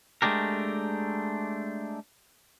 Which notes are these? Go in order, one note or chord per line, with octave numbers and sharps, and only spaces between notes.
G#3 A3 D4 G4 A#4